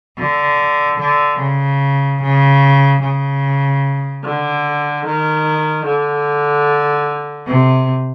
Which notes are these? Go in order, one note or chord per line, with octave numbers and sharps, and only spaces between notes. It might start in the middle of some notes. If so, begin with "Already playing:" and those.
D3
D3
C#3
C#3
C#3
D3
D#3
D3
C3